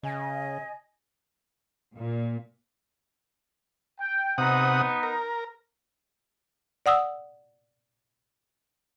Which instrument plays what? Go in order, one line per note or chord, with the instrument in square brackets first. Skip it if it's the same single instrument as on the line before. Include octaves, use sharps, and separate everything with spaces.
[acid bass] C#3 [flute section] D#5 G#5
[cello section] A#2
[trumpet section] G5
[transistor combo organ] C3 F#5 D#6 [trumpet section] B3 D#4
[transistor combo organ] A#4
[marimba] D5 F#5 D#6 E6